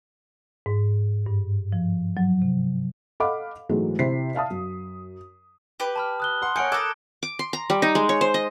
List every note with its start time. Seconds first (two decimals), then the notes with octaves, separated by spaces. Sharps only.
0.66 G#2
1.26 G2
1.73 F3
2.17 F#3
2.42 C3
3.20 A4 D#5 F5 F#5 B5 D6
3.69 G#2 E3 F#3 G#3 A3
3.99 C3 E4 C5 B6 C7
4.35 E5 F5 A5 D#6
4.50 F#2
5.80 G4 B4
5.96 A5 B5 F6
6.20 D#6 F#6 G7
6.42 F#5 C6
6.56 A#3 C#5 F#5 G#5 G6 C#7 D7
6.72 A4 A#4 D6 D#6 F#6 G#6
7.23 D6
7.39 C6
7.53 A#5
7.70 G3
7.82 D#4
7.95 G#3
8.09 C#5
8.21 C5
8.34 D#5